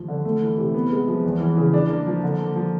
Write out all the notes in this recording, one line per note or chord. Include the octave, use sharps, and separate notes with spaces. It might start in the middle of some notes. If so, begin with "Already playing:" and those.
Already playing: D#2 F3
D3
A3
E3
C3
B3
G#3
F3
E2
E3
C#3
D4
A#3
F3
D3
A#3
F3